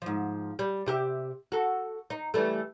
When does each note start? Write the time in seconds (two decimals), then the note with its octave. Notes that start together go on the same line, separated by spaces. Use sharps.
0.02 G#2 F3
0.59 G3
0.86 C3 G4 E5
1.52 F#4 A4
2.10 D#4
2.34 E3 G3 A3